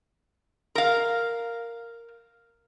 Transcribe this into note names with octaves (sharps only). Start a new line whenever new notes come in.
A#4 F5